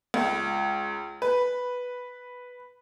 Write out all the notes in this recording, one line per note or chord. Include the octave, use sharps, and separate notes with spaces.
C#2
B4